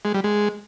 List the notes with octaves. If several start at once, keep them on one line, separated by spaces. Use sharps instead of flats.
G#3
G3
G#3